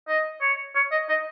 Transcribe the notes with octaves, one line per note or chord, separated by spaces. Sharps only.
D#5
C#5
C#5
D#5
D#5